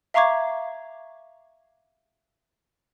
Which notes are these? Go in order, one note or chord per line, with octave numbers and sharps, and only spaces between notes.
E5 F5 A#5 C#6 D6 G#6